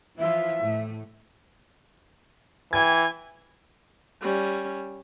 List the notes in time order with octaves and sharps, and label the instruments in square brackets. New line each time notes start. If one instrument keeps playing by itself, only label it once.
[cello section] E3 F3 F4 [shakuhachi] E5
[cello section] A2 A3
[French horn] E3 [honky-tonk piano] G5 G#6 [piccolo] G#5
[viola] G3 C#4